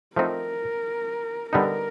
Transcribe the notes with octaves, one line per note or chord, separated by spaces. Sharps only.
F3 A3 C4 D#4 A#4
D3 G3 B3 D#4 A#4